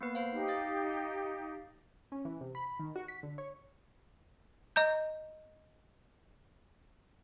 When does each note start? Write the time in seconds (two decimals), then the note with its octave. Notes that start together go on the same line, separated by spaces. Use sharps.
0.01 A#3 B3 B4
0.15 C5 F5
0.32 D#4 G4
0.48 F5 A6
2.12 C#4
2.25 E3
2.41 C3
2.55 B5
2.79 D#3
2.96 F#4
3.08 B6
3.23 D3
3.38 C#5
4.76 D#5 A#5 G6